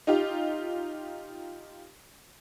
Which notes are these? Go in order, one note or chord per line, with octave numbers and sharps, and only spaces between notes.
D#4 F4 G4